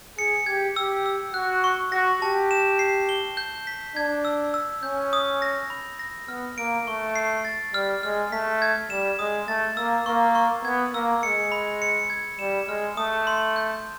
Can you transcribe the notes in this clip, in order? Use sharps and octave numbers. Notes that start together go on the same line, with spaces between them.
G#4 C#7
G4 G#6
G4 E6
E6
F#4 F#6
C#6
F#4 A#6
G4 A5
E7
C7
G7
G6
B6
D4 G#6
E6
E6
C#4 G6
D#6
A#6
B5
A#6
B3 F6
A#3 D7
A3 C#6
C7
A6
G3 F6
G#3 F6
A3 B6
G#6
G3 E7
G#3 D#6
A3 A6
A#3 E6
A#3 C#6
C#6
B3 G#6
A#3 E6
G#3 C#7
B5
C#7
G#6
G3 E7
G#3 F6
A3 D#6
C6
G6